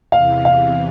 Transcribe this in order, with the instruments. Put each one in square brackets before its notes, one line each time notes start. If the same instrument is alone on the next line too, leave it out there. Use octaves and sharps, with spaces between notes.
[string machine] E2 C3 E3 [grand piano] F5
[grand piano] F5